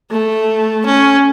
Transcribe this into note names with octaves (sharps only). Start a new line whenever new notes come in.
A3
C#4